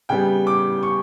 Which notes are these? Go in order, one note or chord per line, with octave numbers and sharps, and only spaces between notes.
C#3 G3 B3 G5
D6
C#6